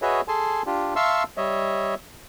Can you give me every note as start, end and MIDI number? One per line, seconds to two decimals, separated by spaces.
0.02 0.21 66
0.02 0.21 68
0.02 0.21 71
0.02 0.21 73
0.02 0.21 75
0.02 0.21 76
0.28 0.62 68
0.28 0.62 69
0.28 0.62 80
0.28 0.62 81
0.28 0.62 84
0.66 0.94 62
0.66 0.94 65
0.66 0.94 67
0.96 1.23 76
0.96 1.23 77
0.96 1.23 81
0.96 1.23 84
0.96 1.23 85
0.96 1.23 88
1.37 1.95 55
1.37 1.95 73
1.37 1.95 75
1.37 1.95 76